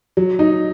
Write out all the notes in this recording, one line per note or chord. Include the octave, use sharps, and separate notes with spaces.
F#3
D#4